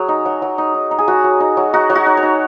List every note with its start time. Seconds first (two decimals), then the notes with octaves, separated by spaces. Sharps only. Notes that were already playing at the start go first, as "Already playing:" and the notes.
Already playing: F#3 G#4
0.09 D#4
0.25 F#3
0.42 F#3
0.58 D#4
0.74 D#4
0.91 D#4
0.99 G#4
1.08 F#3 F#4
1.24 F#3
1.40 D#4
1.57 F#3
1.74 D#4 F#4
1.90 F#3
1.95 F#4
2.06 D#4
2.17 C#5
2.23 D#4